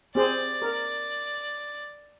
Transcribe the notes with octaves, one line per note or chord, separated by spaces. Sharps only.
C4 G#4 C5 D5
A#4